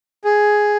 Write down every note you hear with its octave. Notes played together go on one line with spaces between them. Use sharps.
G#4